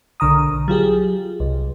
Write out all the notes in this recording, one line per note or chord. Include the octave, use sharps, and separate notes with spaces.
B1 D3 A#5 D#6
F#3 F4 G4 G#4
C2